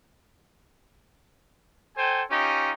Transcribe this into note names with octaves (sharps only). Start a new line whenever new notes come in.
A4 C5 G5 G#5
C#4 D#4 F4 G4